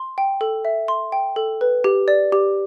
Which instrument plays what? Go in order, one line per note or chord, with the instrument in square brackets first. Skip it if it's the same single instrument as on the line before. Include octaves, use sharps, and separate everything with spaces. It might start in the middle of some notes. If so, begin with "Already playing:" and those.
Already playing: [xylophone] C6
G5
A4
E5
C6
G5
A4
B4
G4
D5
G4